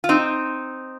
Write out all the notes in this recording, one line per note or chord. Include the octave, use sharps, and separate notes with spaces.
F4
C4 D#4